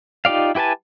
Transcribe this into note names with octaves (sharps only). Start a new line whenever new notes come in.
D#4 F4 G4 D5 F5
E4 G4 B4 G#5 A5